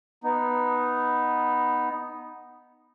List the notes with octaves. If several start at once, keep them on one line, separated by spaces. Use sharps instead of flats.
B3 D#4